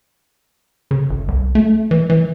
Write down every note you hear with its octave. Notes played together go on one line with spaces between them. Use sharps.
C#3
G1
C2
A3
E3
E3